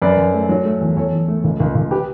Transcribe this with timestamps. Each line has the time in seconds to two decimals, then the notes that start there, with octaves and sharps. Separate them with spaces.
0.02 F#2 B4 D5
0.17 F#2
0.34 A3
0.49 F#3
0.65 A3
0.81 E2
0.96 E2 A4 C#5
1.13 E2
1.28 A3
1.44 C#2
1.60 C#2
1.75 C#2
1.91 G4 B4